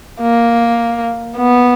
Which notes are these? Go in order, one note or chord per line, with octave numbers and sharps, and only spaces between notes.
A#3
B3